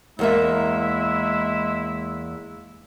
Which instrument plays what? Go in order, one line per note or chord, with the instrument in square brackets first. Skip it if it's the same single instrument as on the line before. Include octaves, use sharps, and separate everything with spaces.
[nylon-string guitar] E2 A#3 E5 [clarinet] G#3 [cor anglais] E4